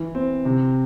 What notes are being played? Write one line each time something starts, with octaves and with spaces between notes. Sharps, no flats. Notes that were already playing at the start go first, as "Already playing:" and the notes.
Already playing: E3
C4
C3